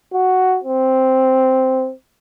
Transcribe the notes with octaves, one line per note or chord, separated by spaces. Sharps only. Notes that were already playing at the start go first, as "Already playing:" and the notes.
F#4
C4